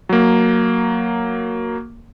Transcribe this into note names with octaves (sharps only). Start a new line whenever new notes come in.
F#3 A#3